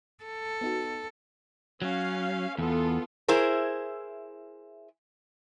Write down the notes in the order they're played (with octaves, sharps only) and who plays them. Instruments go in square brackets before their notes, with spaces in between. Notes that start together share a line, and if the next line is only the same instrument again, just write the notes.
[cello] A4
[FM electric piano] B3 D#4 F#4
[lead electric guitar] F#3 [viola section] C#4 F5
[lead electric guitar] E2 [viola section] B3 F4 A4
[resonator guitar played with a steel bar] E4 G#4 A#4 C5